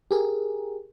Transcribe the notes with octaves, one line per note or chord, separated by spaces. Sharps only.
G4 G#4 A#4